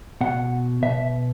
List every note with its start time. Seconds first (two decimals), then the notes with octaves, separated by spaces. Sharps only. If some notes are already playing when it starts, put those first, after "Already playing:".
0.21 B2 F#5
0.82 B2 E5